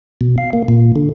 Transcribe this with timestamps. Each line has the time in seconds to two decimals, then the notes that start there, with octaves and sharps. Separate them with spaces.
0.21 B2
0.38 F5
0.53 A#3
0.68 A#2
0.96 D3